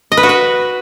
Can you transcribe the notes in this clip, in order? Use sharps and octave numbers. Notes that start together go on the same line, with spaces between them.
D#5
B4
F#4
B4